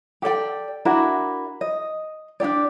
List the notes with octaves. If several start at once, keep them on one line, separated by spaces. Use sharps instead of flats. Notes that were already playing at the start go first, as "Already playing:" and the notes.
G4 A4 D5 G5
D4 E4 F#4 A#4
D#5
D4 D#4 G4 D5